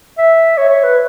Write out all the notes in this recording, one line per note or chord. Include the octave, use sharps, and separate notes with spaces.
E5
C#5
C#5
B4